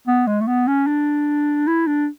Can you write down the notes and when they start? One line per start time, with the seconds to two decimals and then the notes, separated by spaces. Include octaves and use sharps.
0.07 B3
0.27 G#3
0.41 A3
0.47 B3
0.67 C#4
0.87 D4
1.67 E4
1.87 D4